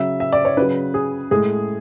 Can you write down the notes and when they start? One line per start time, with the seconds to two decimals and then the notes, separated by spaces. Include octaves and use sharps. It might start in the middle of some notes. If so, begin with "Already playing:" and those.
Already playing: C#3 F#3 E5
0.20 E5
0.33 D5
0.45 C#5
0.57 C#3 F#3 B4
0.94 G#4
1.31 A2 G#3 G#4